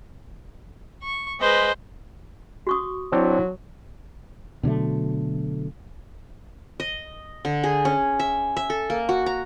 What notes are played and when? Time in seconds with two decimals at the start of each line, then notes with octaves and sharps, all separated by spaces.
1.03 C#6
1.41 G#3 B4 C5 D#5
2.67 F#4 C#6 D#6
3.12 F#3 C4 D4 E4 C#5
4.63 B2 D3 F#3 A3
6.80 D#5
7.45 D3
7.64 G#4
7.85 C#4
8.20 E5
8.57 E5
8.70 A4
8.90 A#3
9.09 F#4
9.26 A#5